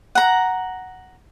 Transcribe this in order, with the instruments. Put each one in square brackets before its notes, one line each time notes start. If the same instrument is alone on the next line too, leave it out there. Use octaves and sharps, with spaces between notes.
[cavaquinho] F#5 A#5